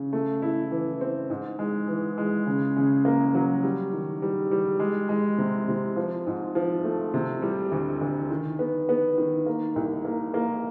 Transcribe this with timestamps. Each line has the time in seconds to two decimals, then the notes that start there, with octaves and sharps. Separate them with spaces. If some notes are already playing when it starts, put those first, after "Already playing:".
Already playing: C#3
0.13 A3
0.42 E4
0.71 E3
1.01 C4
1.30 G#2
1.59 G#3
1.88 E3
2.18 G#3
2.47 C#3
2.76 C#3
3.05 A#3
3.35 F#3
3.63 G3
3.93 D#3
4.22 G3
4.51 G3
4.80 G#3
5.09 G#3
5.38 C3
5.68 C3
5.96 F3
6.27 G#2
6.55 F3
6.84 A3
7.14 C3
7.42 G3
7.72 D2
8.01 D2
8.31 D#3
8.59 B3
8.89 B3
9.18 D#3
9.46 A#3
9.76 C2
10.05 A#3
10.34 A#3